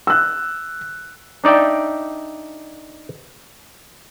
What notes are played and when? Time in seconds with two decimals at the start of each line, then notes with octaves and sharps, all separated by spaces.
0.07 E6 F#6
1.44 D4 D#4 D5 E5 G5